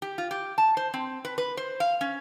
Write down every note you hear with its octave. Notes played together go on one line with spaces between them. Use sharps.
G4
F4
G4
A5
C5
C4
B4
B4
C5
F5
C#4